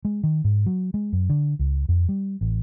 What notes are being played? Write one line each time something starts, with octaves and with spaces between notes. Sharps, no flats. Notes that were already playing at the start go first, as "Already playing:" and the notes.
G#3
D#3
G#2
F#3
G#3
F#2
D3
C#2
F2
G3
A1